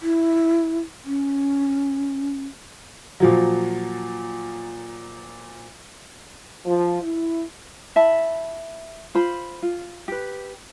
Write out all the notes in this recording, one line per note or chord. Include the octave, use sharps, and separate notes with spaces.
E4
C#4
A#2 F3 F#3
F3
E4
E4 E5 A5 B5
F4 C5 B5
F4
G4 B4